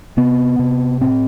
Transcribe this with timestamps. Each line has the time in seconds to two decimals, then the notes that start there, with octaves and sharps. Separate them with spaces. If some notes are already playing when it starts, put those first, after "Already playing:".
0.17 C3 B3
0.59 C3
1.01 A2 C4